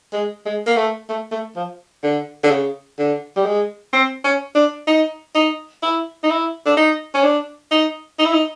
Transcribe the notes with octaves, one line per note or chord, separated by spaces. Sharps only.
G#3
G#3
A#3
A3
A3
A3
F3
D3
D3
C#3
D3
G3
G#3
C4
C#4
D4
D#4
D#4
E4
D#4
E4
D4
D#4
C#4
D4
D#4
D#4
E4
D#4